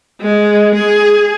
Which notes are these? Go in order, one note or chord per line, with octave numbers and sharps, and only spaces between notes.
G#3
G#4